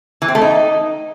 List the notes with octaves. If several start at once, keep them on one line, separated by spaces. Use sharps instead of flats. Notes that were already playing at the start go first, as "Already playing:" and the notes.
E3
C4
A3
D#4